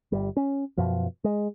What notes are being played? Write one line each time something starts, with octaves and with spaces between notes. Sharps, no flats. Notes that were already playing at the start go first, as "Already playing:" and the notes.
G1 G3
C#4
F#2 B2 F3
G#3